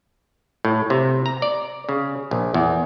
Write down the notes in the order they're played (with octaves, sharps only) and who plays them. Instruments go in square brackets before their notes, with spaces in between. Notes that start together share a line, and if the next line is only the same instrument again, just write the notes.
[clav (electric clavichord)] A2
C3
A#5
D5
C#3
A#1
E2